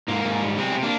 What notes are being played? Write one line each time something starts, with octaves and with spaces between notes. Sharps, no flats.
G#2 A#3
G#2
G3
C3 G#3 C4
C3
A#3 D4